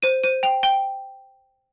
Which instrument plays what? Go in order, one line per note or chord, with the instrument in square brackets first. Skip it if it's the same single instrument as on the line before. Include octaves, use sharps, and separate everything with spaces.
[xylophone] C5 D#7
C5 D#7
G5 F7
G5 G7